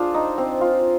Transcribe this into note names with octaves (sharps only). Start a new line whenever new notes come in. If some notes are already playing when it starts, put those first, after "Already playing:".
Already playing: D4 F4 G#4 C5
D#4
C4
F4